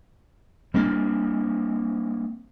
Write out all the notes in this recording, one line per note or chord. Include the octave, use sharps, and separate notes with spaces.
G3 A#3 C4 D4